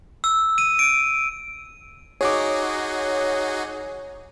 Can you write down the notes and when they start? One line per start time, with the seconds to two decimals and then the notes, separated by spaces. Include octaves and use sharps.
0.24 E6
0.58 D#7
0.79 D7
2.21 D#4 F#4 G#4 C#5 D6